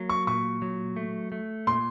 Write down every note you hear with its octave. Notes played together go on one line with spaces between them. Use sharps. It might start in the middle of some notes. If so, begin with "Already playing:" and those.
Already playing: F#3 A#3
C#6
A#2 C#6
F#3
A3
A3
A#2 C6